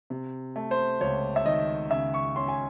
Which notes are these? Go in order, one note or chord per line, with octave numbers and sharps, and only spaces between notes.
C3
A3
C5
C#2 C#5
E5
D#3 D#5
C#3 E5
C#6
C#4 C6
G#5